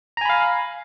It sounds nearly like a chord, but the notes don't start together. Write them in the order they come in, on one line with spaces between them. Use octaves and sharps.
A#5 G#5 B5 F5